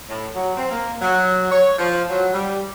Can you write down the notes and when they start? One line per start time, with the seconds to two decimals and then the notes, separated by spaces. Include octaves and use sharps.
0.09 A2
0.36 F#3
0.57 C4
0.71 A#3
1.01 F#3
1.51 C#5
1.78 F3
2.10 F#3
2.33 G3